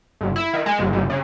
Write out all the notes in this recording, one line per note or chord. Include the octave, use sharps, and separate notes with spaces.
G1
E4
D#3
G#3
G1
G1
C#3